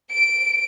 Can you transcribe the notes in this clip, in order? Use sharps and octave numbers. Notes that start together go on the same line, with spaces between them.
D7